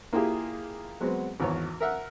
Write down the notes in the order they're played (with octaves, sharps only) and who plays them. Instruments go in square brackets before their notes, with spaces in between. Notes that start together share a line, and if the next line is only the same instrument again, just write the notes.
[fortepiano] A#3 E4 F4 G4 G#4
F#3 G#3 B3 C4
G#1 E2 C#5
A#4 E5 F#5